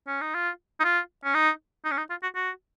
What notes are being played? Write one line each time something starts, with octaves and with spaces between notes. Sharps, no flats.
C#4
D#4
F4
D#4
F4
C#4
D#4
D#4
C#4
D#4
F4
F#4
F#4